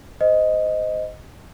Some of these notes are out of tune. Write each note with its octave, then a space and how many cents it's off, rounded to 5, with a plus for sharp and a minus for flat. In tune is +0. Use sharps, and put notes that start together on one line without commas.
C5 -25 D#5 +0